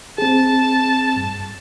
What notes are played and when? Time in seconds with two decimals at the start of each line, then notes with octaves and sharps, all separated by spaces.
0.18 C4 G#4 A5
1.16 G2